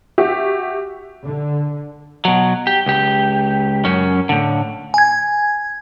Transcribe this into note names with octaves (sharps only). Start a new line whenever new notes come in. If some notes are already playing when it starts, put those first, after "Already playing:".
F#4 G4 E5
D3
B2 F#3
G4
C#2 G4
F#2 C#4
A2 D3
G#5 G#6